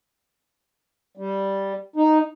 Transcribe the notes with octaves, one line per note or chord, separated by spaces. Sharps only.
G3
D#4